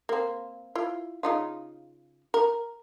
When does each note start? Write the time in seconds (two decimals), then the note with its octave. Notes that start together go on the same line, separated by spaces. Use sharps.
0.09 A#3 C4
0.75 E4 F4
1.23 C#3 D#4 F4
2.34 A#4